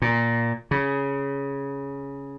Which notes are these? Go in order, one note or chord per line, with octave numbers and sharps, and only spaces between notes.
A#2
C#3